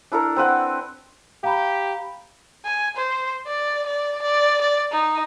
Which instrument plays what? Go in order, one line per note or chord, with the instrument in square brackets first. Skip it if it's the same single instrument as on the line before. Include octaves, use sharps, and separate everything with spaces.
[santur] D4 E4 A4 A#4
C4 B4 F#5 G5
[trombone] G4 [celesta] F5 A#5 B5
[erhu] G#5
C5
D5
D5
D5
D5
D#4